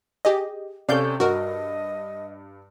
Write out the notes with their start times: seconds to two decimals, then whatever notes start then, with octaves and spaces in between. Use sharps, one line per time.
0.25 G4 G#4 D#5
0.89 C3 C#4 A4 D5 F5 G6
1.20 G2 F#4 A#4 D#5